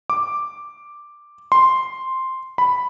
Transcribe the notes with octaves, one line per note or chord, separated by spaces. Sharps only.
D6
C6
B5